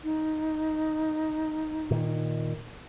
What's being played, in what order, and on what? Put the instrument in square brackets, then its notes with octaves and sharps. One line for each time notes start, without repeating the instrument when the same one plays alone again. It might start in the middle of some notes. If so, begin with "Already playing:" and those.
[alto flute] D#4
[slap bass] A#2 D#3